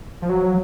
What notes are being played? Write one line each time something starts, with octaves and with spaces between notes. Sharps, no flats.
F3
F#3